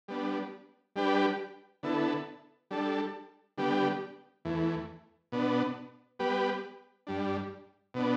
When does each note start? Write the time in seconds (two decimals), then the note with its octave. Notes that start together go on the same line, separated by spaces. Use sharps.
0.08 G3 B3 D4
0.96 G3 D4 G4 B4
1.83 D3 B3 E4 A4
2.71 G3 D4 A4
3.58 D3 G3 B3 G4
4.45 E2 E3 A3
5.32 B2 B3 D4
6.19 G3 B3 G4 B4
7.07 G2 G3 D4
7.94 B2 B3 D4